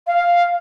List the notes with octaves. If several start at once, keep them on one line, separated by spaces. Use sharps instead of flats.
F5